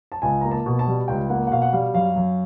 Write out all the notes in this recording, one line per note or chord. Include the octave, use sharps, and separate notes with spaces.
A5
C#2 G#5
A#3 A#5
A5
B2
A5
G3
C#2 G5
A#3 F#5
F#5
B2 F5
F#5
G3 F5
F#2 F5
F#2